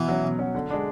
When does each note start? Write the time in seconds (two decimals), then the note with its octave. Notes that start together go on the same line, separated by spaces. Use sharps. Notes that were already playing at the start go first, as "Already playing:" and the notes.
Already playing: B2 E3
0.08 F#3 C#4
0.24 B2
0.39 F#3 C#4
0.55 D3
0.70 G#3 D4